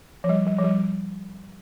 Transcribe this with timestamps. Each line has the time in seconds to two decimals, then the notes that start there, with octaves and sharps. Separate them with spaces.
0.24 F3
0.29 G3
0.47 G3
0.59 F3
0.64 G3